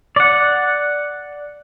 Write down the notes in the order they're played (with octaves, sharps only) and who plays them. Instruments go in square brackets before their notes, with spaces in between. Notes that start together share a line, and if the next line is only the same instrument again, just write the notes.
[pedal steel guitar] D5 F#5